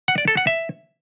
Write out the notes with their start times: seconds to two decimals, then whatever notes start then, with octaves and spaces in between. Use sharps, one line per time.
0.08 F#5
0.18 D5
0.28 A4
0.37 F#5
0.47 E5